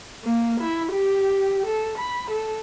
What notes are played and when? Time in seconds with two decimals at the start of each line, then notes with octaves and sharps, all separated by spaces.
0.25 A#3
0.61 E4
0.92 G4
1.67 A4
1.99 B5
2.31 A4